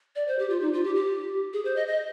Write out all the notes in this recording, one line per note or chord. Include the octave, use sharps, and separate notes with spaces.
D5
C5
G4
F4
D#4
F4
G4
G4
G#4
C5
D#5
D#5